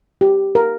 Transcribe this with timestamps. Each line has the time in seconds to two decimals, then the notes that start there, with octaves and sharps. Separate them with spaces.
0.21 G4
0.55 A#4